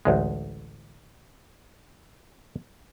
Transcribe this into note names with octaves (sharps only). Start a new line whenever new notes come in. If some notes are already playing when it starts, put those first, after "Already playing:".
A1 D2 G#3